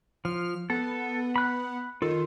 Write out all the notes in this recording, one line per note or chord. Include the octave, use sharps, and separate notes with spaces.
F3 F6
B3 A4
B5 F#6
D#3 F4 A4